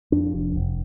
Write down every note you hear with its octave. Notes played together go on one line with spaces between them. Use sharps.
F2 D4
F1
F1